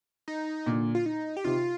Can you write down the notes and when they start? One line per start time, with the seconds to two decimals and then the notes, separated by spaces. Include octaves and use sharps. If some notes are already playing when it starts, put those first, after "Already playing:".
0.28 D#4
0.66 A#2 D3
0.95 F4
1.06 D#4
1.37 G4
1.44 C3 D#3 F4